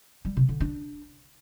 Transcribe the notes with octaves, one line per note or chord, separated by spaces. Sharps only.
G3
C3
D3
D4